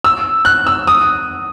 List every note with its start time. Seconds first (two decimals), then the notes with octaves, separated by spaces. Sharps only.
0.04 E6
0.45 F#6
0.67 E6
0.87 D#6